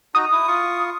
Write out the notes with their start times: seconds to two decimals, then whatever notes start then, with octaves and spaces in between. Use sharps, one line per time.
0.15 D#4 F#4 A#5 D#6
0.31 E4
0.48 F4 C#6